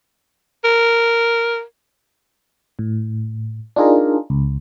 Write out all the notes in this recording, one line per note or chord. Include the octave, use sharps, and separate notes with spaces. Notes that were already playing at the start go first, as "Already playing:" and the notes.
A#4
A2
D4 D#4 F4 G#4 A#4
C#2